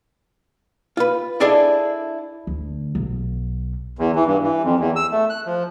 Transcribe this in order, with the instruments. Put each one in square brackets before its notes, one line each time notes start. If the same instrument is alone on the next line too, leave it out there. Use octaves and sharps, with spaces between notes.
[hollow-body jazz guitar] F4 B4
D4 E4 G#4 A4 D5 D#5
[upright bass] D2
B1
[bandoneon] E2
E3
G2
E3
F2
E2
E6
A3
F#6
F3